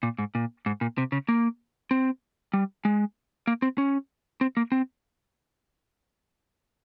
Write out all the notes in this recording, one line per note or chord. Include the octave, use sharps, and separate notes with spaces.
A#2
G#2
A#2
G#2
A#2
C3
C#3
A#3
C4
G3
G#3
A#3
C4
C#4
C4
A#3
C4